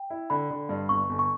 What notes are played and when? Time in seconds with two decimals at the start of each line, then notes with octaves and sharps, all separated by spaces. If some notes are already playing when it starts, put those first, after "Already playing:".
Already playing: G5
0.10 E4
0.30 D3 B5
0.50 D3
0.69 G2
0.89 G1 C#6
1.09 G1
1.19 C#6